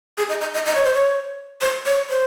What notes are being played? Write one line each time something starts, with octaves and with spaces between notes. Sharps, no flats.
G#4
D#5
D#5
D#5
D#5
C#5
C5
C#5
C5
C#5
C5